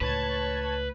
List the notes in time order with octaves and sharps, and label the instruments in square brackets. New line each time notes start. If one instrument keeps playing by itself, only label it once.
[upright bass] C#2 A2 [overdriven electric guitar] B4 [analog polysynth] C#5 A5 G#6